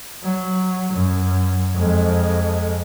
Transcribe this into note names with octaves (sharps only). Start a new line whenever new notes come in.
F#3
F#2
F2 G#3